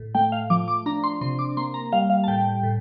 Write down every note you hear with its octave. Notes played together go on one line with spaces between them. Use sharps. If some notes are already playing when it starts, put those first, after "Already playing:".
Already playing: A2
A3 G5
F5
F3 D6
D6
D4 A#5
C6
C3 C6
D6
A#3 C6
A#5
G3 F5
F5
A5
A2 G5
A2